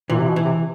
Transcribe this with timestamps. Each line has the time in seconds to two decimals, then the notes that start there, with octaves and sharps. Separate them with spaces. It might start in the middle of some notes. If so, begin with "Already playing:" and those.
0.10 A#2 E3
0.19 C3
0.28 B2
0.36 E3
0.45 C3